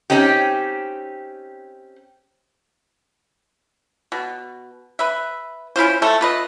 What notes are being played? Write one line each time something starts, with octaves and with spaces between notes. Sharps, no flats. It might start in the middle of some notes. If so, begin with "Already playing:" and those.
C4 C#4 D#4 G4
B2
B4 E5
C#4 E4 F4 C5
A3 A4
F4 B4 D#5